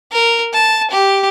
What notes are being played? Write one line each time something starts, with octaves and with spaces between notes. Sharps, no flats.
A#4
A5
G4